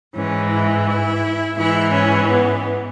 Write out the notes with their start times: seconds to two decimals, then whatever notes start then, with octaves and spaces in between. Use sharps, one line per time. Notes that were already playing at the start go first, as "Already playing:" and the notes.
0.14 G#2 E3 C#4
0.50 E4
0.87 E4
1.57 G#2 E3 E4
1.94 C#4
2.30 B3